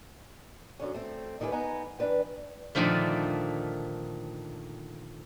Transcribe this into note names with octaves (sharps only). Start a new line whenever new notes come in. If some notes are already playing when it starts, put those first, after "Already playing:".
F#2 D3 C#4
A3 C4
A#2 D#3 A3 G4 B4 G#5
B3 D#4 B4 G#5 A#5
E3 D4 B4 G5
A#2 D3 D#3 F3 A3